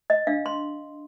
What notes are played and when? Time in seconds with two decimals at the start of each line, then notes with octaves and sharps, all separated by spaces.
0.10 D#5
0.27 D4 F5
0.46 C6